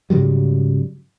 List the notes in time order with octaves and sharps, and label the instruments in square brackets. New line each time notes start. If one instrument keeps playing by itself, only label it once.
[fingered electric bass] G#2 C#3 F#3 G3